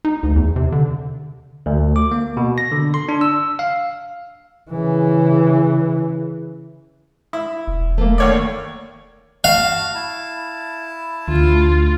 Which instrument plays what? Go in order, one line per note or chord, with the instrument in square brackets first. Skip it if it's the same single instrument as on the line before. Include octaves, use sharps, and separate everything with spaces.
[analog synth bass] D#4
D2
E2
C3
D3
[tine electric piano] D2
D6
A#3
B2
A#6
D3
C6
D4
E6
F5
[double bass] C#3 E3
[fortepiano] E4
[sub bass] E1
[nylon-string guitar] A3 A#3
[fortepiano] D#2 C#5 D5
[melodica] F#4 A5 [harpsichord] F5
[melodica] E4 A5
[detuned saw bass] D2 [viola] F4